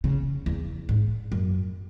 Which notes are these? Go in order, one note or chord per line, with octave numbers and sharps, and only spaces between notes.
C#3
E2
G#2
F#2